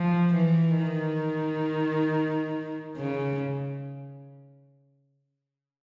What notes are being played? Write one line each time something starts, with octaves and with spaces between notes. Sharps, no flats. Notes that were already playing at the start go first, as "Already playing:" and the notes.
Already playing: F3
E3
D#3
C#3